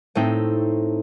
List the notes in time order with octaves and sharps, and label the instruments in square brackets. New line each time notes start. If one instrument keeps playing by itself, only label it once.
[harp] A2 A3 C4 D#4